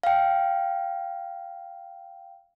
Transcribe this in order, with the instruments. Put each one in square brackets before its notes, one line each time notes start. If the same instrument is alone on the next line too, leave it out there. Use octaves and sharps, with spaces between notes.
[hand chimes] F5 G5